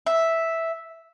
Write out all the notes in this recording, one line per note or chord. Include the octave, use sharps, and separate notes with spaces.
E5